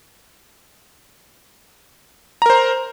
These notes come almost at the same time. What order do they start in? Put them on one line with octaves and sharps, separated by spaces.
A#5 A#4 C5